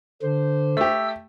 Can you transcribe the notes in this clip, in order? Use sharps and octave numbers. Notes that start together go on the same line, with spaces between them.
D3 D4 C5
A3 G4 E6